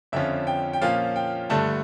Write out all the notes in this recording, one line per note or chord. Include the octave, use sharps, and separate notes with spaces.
F2 D3 F3 C#4 F4 E5
G5
G5
A#2 F3 C#4 F4 F5
G5
G2 D3 A3 A5